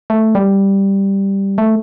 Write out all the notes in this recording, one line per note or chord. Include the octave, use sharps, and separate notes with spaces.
A3
G3
A3